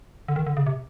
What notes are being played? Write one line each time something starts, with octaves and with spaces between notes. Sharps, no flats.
D3
D#3
D3
C#3
C3